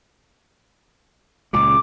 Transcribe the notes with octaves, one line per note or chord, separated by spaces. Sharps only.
C#2 A#2 C#3 D6